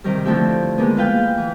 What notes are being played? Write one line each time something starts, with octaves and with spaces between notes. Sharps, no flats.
C3 D#3 G3
D3 F3 A3 C4 E4 G4
D#3 G#3 A#3 B3
F4 B4 F5 G5
E3